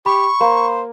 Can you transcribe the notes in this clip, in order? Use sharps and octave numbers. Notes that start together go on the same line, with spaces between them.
G4 B5 C#6
A#3 C5